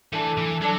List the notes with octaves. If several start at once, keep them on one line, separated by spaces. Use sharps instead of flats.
E3 A3 D4 A4
E3
F#3 D4 A4